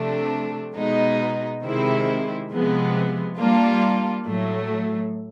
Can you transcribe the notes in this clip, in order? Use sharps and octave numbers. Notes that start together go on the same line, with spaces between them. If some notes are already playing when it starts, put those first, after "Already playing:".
Already playing: C3 F3 A3 D4
B2 G#3 B3 D#4
C3 D#3 G#3 C4 E4
C3 F3 G#3 B3
G3 A#3 D4 F4
A2 F#3 A3